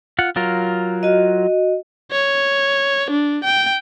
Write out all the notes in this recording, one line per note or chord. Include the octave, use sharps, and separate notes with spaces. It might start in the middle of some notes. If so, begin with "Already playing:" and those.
F4 F#5
F#3 F4 A#4
F#4 D#5
C#5
D4
G5